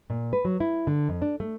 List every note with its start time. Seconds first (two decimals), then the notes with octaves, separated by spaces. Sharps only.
0.10 A#2
0.33 B4
0.45 F#3
0.60 E4
0.87 D3
1.09 F2
1.22 D4
1.40 A3